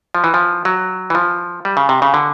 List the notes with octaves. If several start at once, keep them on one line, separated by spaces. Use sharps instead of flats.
F3
E3
F3
F#3
E3
F3
G3
C#3
C3
C#3
D3